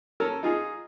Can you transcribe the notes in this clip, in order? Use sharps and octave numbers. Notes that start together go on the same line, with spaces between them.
C#4 A4 A#4
D#4 F4 G#4